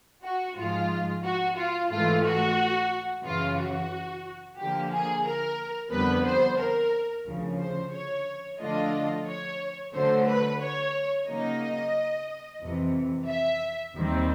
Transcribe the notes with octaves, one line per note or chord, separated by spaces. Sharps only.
F#4
G#2 F3 G#3 F4
F#4
F4
G#2 E3 A3 F4
F#4
F#2 C#3 E3 F4
F#4
D3 F3 A#3 G4
G#4
A#4
F2 D3 G3 B3 B4
C5
A#4
D2 C#3 F3
C5
C#5
D3 F3 A3 D4 F4 D#5
C#5
D3 F#3 A3 C5
B4
C#5
C#3 F#3 A#3 D#4 D#5
F2 C3 E3
E5
D#2 D#3 G3 C4